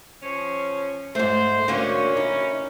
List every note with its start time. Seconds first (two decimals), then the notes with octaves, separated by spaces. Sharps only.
0.22 F3 C#4
1.15 G#2 A3 C5
1.68 D3 A#3 C#4 F#4
2.17 D#4 E4